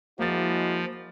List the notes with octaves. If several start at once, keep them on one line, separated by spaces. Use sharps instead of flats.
F3 G#3 A#3 E4 F#4 A6